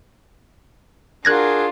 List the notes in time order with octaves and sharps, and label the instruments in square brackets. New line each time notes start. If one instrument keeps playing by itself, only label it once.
[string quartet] D4 F4 [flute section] F#4 G#4 A#4 [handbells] F#6 G#6 A#6